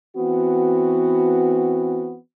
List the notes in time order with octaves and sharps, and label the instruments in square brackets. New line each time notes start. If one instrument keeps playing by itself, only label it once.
[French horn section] E3 B3 C4 F#4